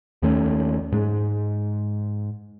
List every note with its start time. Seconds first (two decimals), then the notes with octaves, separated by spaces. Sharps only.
0.22 D#2 D#3 A3 C#4
0.92 G#2 G#3